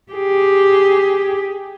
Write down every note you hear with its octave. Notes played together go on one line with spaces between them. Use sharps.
G4 G#4